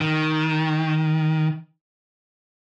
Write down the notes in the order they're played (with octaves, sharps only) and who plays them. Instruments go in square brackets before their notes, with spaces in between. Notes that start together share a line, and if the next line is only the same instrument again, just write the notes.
[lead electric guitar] D#3